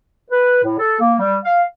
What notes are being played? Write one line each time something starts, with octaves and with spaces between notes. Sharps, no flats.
B4
A2
A4
A#3
G3
F5